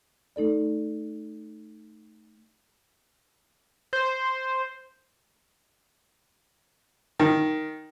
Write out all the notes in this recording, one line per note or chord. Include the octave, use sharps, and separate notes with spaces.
A3 D#4 A4 D5
C5
D#3